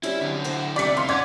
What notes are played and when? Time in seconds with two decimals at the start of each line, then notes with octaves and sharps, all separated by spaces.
0.03 G3 C4 C#4 E4
0.20 D3 E4
0.44 F#4 C5
0.76 D2 C3 G3 D4 D5 B6 C#7
0.97 D#3 F5 C6
1.09 C#4 D5 F#5 G#6